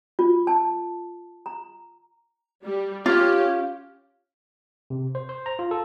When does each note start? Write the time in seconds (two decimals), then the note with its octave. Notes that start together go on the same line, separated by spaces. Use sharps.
0.19 F4
0.47 A5
1.46 A#5
2.63 G3
3.06 C#4 F4 G4
4.90 C3
5.15 C5
5.29 C5
5.46 A#5
5.59 F4
5.71 A4